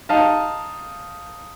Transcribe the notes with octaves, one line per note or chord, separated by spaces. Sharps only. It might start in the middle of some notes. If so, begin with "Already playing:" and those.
D#4 F5 A5